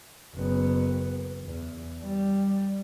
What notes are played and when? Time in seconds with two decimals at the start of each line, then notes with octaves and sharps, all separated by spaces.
0.35 F#1 B3
1.44 E2
2.03 G3